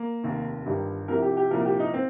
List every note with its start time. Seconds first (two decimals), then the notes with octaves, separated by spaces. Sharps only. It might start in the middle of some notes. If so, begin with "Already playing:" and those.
Already playing: A#3
0.23 F1 D#2 D#3
0.66 G1 G2 D#3 G3
1.08 C2 C3 F3 A#4
1.22 G4
1.37 G4
1.51 C2 A#2 F3 A#4
1.65 G4
1.79 D#4
1.94 C4